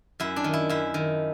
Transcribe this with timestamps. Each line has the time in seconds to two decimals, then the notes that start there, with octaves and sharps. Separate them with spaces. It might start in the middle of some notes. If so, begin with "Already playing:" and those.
0.20 F#2 E4
0.36 D4
0.44 D#3
0.53 E4
0.69 F#2 E4
0.94 D#3